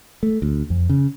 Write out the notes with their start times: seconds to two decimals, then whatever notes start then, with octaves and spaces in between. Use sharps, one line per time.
0.23 A3
0.42 D2
0.70 F2
0.90 C#3